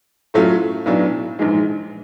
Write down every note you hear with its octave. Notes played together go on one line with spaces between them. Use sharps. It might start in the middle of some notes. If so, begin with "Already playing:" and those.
A2 F#3 A3 C#4 F4
B1 A2 F#3 B3 D4
A#1 G#2 E3 G#3